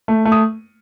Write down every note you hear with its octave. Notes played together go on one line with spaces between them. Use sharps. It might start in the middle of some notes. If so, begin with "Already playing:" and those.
A3
A3
D#6